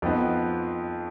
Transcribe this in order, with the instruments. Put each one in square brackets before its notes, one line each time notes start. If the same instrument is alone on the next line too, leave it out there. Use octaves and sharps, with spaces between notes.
[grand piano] F2 F3 B3 D#4